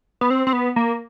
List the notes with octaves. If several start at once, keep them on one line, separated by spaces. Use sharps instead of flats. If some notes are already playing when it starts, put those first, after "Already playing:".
B3
C4
C4
B3
A#3